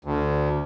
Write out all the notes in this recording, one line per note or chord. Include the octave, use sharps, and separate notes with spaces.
D2